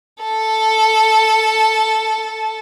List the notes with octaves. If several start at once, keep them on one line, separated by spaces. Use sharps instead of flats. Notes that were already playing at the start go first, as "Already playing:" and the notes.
A4 A5